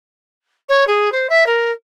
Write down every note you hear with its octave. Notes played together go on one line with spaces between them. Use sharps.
C#5
G#4
C5
E5
A#4